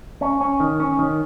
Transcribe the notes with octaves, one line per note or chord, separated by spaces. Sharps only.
C#4
C#4
D#3
C#4
D#3